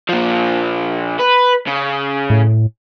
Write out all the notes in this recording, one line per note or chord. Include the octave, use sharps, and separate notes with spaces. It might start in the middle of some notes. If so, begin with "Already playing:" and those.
A#2 F3
B4
C#3
A2